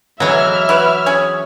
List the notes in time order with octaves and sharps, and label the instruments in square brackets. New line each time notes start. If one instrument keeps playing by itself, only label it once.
[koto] E3 F#3 [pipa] G#3 B3 [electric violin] E5 F6
[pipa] E4 F#4 B4
C#4 G#4 C#5